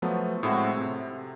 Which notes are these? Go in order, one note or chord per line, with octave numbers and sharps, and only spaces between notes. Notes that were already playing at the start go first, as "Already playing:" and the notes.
F3 F#3 A3 B3
A2 G#3 C4 E4 F#4
C3